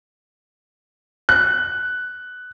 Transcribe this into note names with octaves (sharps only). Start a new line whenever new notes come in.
F#6